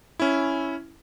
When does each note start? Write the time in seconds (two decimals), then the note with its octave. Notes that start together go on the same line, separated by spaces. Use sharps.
0.20 C#4 E4